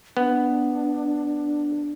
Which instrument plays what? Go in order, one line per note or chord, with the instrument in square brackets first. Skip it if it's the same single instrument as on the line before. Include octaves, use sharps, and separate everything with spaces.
[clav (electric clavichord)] B3 [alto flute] D4